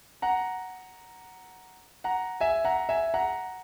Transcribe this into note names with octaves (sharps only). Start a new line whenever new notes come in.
F#5 A#5
F#5 A#5
E5 G#5
F#5 A#5
E5 G#5
F#5 A#5